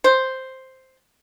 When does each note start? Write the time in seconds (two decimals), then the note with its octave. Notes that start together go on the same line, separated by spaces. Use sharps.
0.04 C5